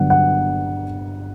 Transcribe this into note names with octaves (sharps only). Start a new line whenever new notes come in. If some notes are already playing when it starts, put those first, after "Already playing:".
Already playing: G1 G2 F#3 B3 D4 F#5
F#5